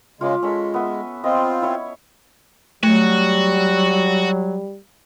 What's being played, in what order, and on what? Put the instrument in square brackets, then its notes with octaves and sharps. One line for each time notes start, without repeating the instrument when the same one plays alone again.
[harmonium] C#3 G#3 [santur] F4 E5 D6
[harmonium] G#3 [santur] C#4 A4 B5
[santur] B3 E5
[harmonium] C4 F4 [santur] D#5
[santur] E4 C#5
[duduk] F#3 [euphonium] G3 [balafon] A3 [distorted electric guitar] F#4